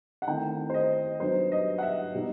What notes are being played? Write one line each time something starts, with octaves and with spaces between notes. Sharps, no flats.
F#5
D#3 A3 C4 E4 G5
C5
D#5
G2 F#3 B3 D#4 C5
D#5
F#5
E5
B2 G3 D#4